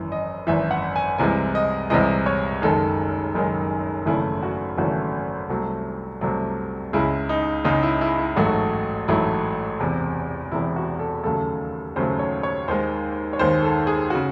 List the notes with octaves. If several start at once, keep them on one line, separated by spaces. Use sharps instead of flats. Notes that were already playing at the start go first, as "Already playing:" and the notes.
Already playing: G#1 F#2 E3
D#5
G#1 F#2 E3 E5
F#5
G#5
C2 C3 E3 G#3 G#5
D#5
C2 C3 E3 G#3 D#5
C#5
F#1 F#2 D#3 G#3 A4
F#1 F#2 D#3 G#3
G#1 F#2 C#3 E3 A3 E4
F#4
G#1 F#2 C#3 E3 A3 F#4
C2 C3 F#3 A3
C2 C3 F#3 A3
C#2 C#3 G#3 E4
D#4
C#2 C#3 G#3 D#4
E4
E4
E4
A1 G#2 F#3 A3 F#4
A1 G#2 F#3 A3 E4
E1 E2 C3
E1 E2 C3 E4
F#4
A4
D#2 C#3 F#3 A3 A4
D#2 C#3 F#3 A3 C5
C#5
C#5
D#2 D#3 G#3 C5
C#5
D#2 D#3 G#3 C5
A4
G#4
C#3 F#4